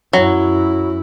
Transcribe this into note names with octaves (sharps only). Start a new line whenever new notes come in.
F#2 F#3 E4